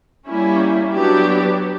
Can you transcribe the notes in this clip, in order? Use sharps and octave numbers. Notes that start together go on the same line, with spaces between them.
G3 A#3 C#4 E4
F#3 B3 D4 G4